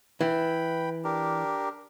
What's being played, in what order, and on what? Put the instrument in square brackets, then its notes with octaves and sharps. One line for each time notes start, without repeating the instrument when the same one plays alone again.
[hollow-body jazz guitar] E3 [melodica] G5 B5
[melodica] D4 G4 A#4